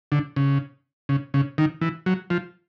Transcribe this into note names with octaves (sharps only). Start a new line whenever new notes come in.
D3
C#3
C#3
C#3
D#3
E3
F#3
F3